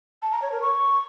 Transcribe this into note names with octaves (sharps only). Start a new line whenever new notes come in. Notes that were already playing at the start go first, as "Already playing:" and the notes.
A5
A#5
C#5
A#4
C#6